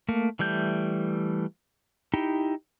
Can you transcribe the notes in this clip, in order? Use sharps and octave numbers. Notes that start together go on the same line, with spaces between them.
A3 A#3
E3 G3 A3 G6
D#4 E4 G4